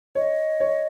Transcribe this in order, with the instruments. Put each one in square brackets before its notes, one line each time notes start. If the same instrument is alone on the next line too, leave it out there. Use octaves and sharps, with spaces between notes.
[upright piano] C#5 [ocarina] D#5
[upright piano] C#5